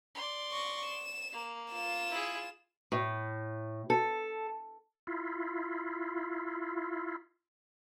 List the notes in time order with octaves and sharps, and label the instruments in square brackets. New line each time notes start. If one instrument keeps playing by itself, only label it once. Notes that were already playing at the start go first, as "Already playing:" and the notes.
[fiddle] D5 C6
[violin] C#6 A#6
E7
[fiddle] A#3
[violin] F4 E7
[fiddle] E4 G#4
[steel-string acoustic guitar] A2
A4
[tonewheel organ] E4 F4